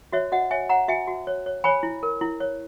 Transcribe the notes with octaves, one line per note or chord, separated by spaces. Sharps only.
F#4 C#5 E5
F#4 D#5 F#5
C#5 E5 G#5
C#5 F#5 A#5
F#4 E5 G#5
F#4
C#5
C#5
C#5 G#5 B5
E4
A#4
E4
C#5